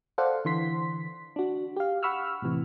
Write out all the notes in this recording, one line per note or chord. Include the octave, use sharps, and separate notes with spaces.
A4 C5 D5 F5 F#5
D3 E3 C6 B6
D4 F#4
G4 F5
F#5 B5 C#6 E6 F6
A2 C3 E3